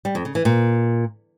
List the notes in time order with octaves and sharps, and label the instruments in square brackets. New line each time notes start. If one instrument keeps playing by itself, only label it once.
[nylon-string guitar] G3
F2
C#3
E3
A#2